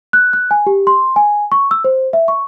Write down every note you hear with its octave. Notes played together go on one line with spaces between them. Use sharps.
F#6
F#6
G#5
G4
C6
G#5
C#6
E6
C5
E5
C#6